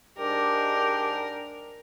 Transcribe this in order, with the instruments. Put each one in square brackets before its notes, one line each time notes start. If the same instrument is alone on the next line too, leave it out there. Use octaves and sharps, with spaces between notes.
[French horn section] G#2 D4 [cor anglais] G4 [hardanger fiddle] A#4